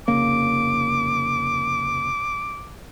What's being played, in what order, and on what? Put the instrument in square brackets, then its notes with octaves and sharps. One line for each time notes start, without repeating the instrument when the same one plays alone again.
[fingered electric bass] F1 C#3 A#3 [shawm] D6